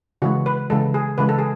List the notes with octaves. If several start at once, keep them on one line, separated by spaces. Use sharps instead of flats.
C#3 E3 G#3 F#4
B4
C#3 E3 G#3 A4
G#4
C#3 E3 G#3 B4
A4
G#4